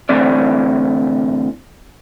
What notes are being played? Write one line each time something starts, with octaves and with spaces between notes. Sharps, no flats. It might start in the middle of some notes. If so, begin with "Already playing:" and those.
B1 A2 D3 E3 C4 D5